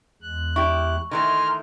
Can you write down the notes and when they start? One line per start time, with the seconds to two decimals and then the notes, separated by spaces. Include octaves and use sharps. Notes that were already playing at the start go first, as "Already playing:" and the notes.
0.22 E2 G#3 F#6
0.56 E4 G4 C#6
1.11 D#3 E3 A3 G#5 A#5 C6 F6